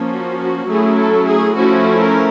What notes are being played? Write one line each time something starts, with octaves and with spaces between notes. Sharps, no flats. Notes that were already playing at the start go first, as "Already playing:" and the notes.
Already playing: F3 A#3 C#4
F#4
F#4
F#3 A3 C#4 E4 G#4
A4
G#4
F3 A3 C#4 E4 F#4
A#4